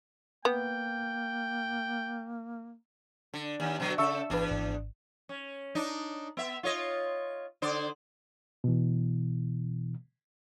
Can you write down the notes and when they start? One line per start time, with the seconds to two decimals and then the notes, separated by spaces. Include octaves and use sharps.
0.45 A#3 B3 G5
3.34 D3
3.60 D#2
3.80 B2 D3 F#3
3.98 C#3 A4 E5 C#6 E6
4.30 G#1 E2 D4 B4
4.51 G#1
5.29 C#4
5.75 D4 D#4
6.37 B3 E5
6.63 F4 C#5 D#5
7.62 D3 C5 D5
8.64 B2 E3